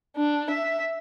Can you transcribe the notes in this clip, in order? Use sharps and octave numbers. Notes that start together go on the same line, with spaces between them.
D4
E5